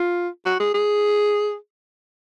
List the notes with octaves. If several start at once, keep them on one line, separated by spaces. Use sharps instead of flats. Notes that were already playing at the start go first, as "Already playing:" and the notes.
Already playing: F4
F#4
G#4
G#4